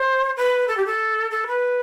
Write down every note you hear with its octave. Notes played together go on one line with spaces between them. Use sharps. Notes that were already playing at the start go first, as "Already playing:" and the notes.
Already playing: C5
B4
A4
G4
A4
A4
B4